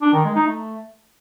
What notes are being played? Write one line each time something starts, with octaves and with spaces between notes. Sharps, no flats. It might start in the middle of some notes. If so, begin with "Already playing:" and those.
D4
D#3
G#3
D#4
A3